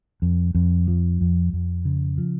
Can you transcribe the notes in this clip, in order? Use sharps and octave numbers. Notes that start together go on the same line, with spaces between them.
F2
F2
F3
F2
F2
C#3
F3